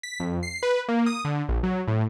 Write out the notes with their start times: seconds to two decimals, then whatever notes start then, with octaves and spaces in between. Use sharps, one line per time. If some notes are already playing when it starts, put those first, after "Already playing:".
0.03 B6
0.20 F2
0.43 C7
0.63 B4
0.88 A#3
1.06 D#6
1.25 D3
1.49 A#1
1.63 F#3
1.88 A2